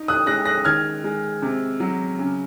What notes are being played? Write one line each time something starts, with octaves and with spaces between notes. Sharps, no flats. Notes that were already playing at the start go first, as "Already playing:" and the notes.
Already playing: D#4
D#6 F#6
G#3 F#6 A#6
F#6 A#6
D#3 F6 G#6
G#3
C3
F#3
C#3